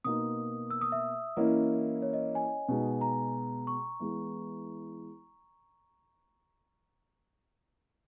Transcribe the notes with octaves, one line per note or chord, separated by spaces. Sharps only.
B2 A#3 D#4 D#6
E6
D#6
E5
E3 A#3 C#4 E4 D#5
C#5
D#5
G#5
B2 G#3 D#4
A#5
C#6
E3 G#3 B3 E4